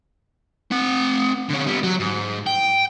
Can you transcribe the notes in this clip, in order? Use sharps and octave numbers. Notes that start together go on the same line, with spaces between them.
C4 F#5
D3 C#4
G3 B3
F#3
G#2
G5